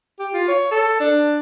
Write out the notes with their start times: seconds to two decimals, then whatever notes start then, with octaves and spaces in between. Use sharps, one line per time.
0.19 G4
0.34 F4
0.48 C#5
0.71 A4
1.00 D4